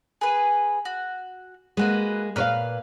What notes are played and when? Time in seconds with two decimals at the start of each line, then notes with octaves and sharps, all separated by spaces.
0.21 G#4 B4
0.85 F#4
1.77 G#3 A#3 F#4 B4
2.36 A#2 B4 C#5 F5 F6